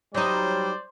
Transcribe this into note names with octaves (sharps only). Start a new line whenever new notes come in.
F#3 G3 D#4 C5 D5